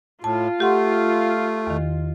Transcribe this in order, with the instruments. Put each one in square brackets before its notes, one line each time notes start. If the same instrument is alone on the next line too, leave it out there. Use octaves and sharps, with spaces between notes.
[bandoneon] A2 [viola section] F4 [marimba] A5
[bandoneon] A3 [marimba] G4 F#5 C6
[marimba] E2 D#3